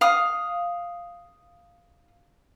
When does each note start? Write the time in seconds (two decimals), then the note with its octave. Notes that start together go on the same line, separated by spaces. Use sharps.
0.01 F5 D#6